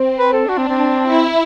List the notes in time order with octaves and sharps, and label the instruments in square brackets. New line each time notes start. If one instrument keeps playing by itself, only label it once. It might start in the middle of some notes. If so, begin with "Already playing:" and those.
Already playing: [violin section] C4
[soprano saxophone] B4
A4
[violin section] D4 [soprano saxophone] F#4
[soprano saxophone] C4
C4
[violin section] E4